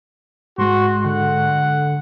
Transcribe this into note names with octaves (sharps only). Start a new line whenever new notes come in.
G#2 G#3 F#4 C6
D3 F#5